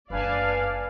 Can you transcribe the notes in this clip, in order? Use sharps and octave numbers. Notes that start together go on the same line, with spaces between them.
F#1 D4 B4 D5 F5 G#5 A5